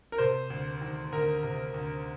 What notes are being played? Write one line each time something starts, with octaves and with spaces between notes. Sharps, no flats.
A#4
C3 C5
D2
D#3
D2 A#4
C3
D2